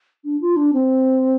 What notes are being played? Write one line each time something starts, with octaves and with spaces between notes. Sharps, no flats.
D4
F4
D4
C4